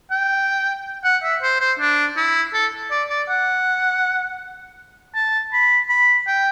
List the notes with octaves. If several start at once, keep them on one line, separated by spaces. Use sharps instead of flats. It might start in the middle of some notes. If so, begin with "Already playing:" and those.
G5
F#5
E5
C5
C5
D4
E4
A4
D5
D5
F#5
A5
B5
B5
G5